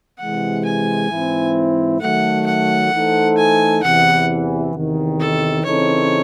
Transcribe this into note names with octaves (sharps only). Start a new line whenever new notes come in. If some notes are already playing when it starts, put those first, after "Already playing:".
C3 E3 G#3 F#5
G#5
G#2 E3 C4 E4
D#3 F#3 A3 F#5
F#5
E3 A3 D#4 A4 C5
G#5
E2 C3 E3 F#5
E2 C3 D#3
A4
C#3 E3 C4 D#4 A4 C#5